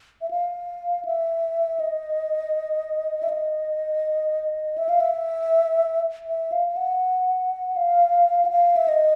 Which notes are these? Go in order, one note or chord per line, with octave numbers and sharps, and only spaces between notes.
E5
F5
E5
D#5
E5
D#5
E5
F5
E5
E5
F5
F5
F#5
F5
F#5
F5
E5
D#5